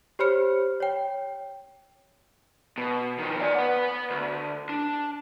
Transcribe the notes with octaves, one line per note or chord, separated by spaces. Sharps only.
G4 C5 C#5 B5 F6 C#7
C#5 G5
B2
D#3 F3
D5 G#5
B4 F#5
D2
D4